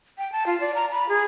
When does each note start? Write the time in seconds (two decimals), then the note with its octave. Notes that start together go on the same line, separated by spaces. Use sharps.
0.18 G5
0.32 A5
0.46 F4
0.60 D5
0.75 A#5
0.92 B5
1.09 G#4